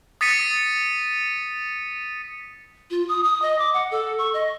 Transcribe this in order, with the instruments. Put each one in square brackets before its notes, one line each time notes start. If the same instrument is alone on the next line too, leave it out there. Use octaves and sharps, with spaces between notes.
[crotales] D#6 A6 B6 C#7 D#7
[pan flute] F4
D#6
D#6
D#5
D6
F#5
A4
C#6
D#5